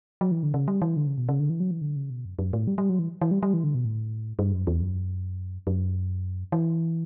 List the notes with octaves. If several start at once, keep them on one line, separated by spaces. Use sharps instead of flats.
F#3
E3
D3
C#3
G3
E3
D3
C#3
B2
C#3
D3
E3
F#3
E3
D3
C#3
B2
F#2
F#2
A2
G3
G3
F#3
E3
E3
G3
G3
E3
D3
B2
A2
G2
F#2
E2
F#2
F#2
E3